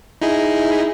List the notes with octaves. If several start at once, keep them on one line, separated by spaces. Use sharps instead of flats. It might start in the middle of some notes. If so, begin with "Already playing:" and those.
D#4 E4 G#4